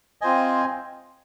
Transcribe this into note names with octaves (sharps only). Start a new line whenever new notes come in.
C4 F4 C5 D#5 G#5